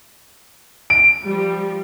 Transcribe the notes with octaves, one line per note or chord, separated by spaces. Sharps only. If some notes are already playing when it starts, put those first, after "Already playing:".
D7
F3 G3